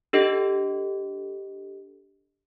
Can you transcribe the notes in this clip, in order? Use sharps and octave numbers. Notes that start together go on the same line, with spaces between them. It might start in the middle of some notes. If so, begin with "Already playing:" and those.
D4 G4 A4 D#5